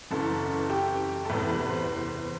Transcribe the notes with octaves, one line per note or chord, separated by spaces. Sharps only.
F#1 F#2 E3 A4
G4
A4
E2 C3 E3 B4
B4
C5